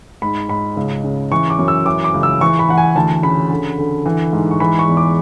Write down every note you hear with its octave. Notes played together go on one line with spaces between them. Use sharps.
G#2 B5
G#2 B5
C#2
C#3
E3 C#6
D6
F#2
E6
E3 D6
D6
C#2
E6
E3 C#6
B5
E3 F#5
G#5
D2 A5
C#3 B5
D3
D3
E3
G#2
C#6
E3 B5
C#6
E2
D6